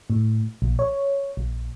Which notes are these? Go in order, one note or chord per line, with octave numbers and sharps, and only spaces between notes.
A2
A#1
C#5
A#1